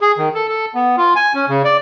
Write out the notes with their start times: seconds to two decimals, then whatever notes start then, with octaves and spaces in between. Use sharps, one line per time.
0.01 G#4
0.18 D#3
0.34 A4
0.48 A4
0.75 B3
0.97 F4
1.16 G#5
1.35 C#4
1.48 C#3
1.64 D5